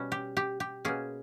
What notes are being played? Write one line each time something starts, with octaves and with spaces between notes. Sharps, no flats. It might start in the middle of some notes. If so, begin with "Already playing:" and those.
Already playing: B2 G3 C#4
G4
G4
G4
B2 A#3 C#4 G#4